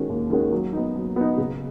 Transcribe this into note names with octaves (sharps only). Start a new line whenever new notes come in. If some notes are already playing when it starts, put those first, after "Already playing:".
Already playing: D#3 G#3 C#4 F#4
D#2
D#3 G#3 C#4 F#4
F#3
B3 D#4
F#3
B3 D#4
C#3